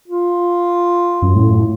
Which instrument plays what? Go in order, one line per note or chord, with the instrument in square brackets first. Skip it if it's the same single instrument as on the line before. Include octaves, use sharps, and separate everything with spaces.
[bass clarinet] F4
[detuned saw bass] F#2
A2